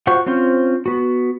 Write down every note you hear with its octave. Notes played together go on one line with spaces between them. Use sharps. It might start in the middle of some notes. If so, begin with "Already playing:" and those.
F4 F#4 C5 F#5 C#6
C4 C#4 F4 C5
B3 F#4